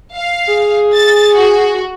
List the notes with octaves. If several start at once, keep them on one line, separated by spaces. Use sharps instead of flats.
F5
G#4
A6
F#4